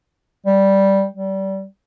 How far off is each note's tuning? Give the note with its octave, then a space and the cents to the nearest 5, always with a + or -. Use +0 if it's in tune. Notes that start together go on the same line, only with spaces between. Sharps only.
G3 -5
G3 -25